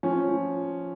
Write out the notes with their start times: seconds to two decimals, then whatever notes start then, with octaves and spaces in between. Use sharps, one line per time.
0.03 F3 C#4
0.28 F3